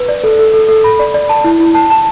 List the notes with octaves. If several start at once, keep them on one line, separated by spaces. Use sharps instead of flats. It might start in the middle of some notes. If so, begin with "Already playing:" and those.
Already playing: B4
D5
A4
A4
A4
A4
B5
D5
D5
A5
E4
E4
A5
A5